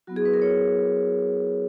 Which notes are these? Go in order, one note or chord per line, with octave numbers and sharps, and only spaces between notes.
F#3 B3 E4 F#4
G#4
B4
A#4
C#5